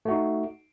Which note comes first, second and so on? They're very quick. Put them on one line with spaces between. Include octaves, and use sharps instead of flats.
A3 F#4 D#4